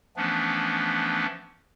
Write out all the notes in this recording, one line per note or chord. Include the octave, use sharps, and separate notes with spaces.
E3 F3 A3 B3 C#4 D4